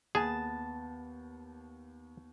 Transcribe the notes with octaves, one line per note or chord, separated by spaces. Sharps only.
D#2 B3 G#4 A5